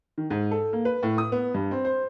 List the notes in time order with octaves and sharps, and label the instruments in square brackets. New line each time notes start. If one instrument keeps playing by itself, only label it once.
[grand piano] D#3
G#2
A4
A#3
B4
A2
D#6
B3
G2
C4
C5